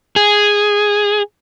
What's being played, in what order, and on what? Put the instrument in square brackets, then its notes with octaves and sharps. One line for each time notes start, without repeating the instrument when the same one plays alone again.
[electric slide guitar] G#4